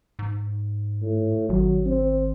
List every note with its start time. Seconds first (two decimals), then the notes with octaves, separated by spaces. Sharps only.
0.19 G#2
1.02 A2
1.49 G#1 F#3
1.86 C4